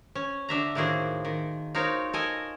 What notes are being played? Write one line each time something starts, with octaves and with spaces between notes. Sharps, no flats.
C#4
D3 D4 E5 A#5
A2 D#3 A#3 F#4 G#4 C5
D#3
D#4 F4 F#4 A#4 C5 C#5
A4 A#4 D#5 G#5